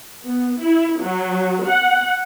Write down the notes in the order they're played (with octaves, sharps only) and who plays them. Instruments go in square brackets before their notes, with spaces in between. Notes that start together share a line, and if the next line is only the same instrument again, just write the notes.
[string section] B3
E4
F#3
F#5